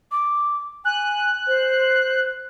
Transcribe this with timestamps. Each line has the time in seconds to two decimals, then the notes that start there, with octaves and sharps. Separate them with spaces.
0.12 D6
0.85 G#5 F#6
1.47 C5